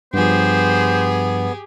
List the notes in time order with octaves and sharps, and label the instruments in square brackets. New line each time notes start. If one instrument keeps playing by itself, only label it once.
[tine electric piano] G2 F3 [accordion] B3 [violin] G4 G#4 [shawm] C5